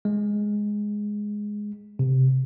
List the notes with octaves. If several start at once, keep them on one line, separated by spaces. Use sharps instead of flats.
G#3
C3